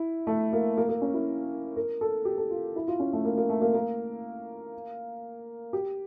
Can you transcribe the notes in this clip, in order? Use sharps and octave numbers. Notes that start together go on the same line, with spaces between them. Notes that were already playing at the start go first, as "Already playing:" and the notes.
Already playing: E4
A3
A#3
A#3
A#3
C#4
E4
A#4
A4
G4
A4
F4
E4
F4
C#4
A3
A#3
A#3
A3
A#3
A#3
G4